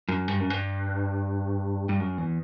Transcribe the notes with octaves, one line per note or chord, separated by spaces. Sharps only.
F#2
G2
F#2
G2
G2
F#2
E2